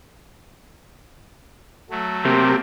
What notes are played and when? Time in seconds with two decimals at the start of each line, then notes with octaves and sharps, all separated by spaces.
1.90 F#3 A3
2.25 C3 A#3 G4